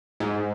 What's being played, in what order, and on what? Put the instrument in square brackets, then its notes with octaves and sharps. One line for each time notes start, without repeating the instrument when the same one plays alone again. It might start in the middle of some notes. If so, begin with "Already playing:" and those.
[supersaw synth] G#2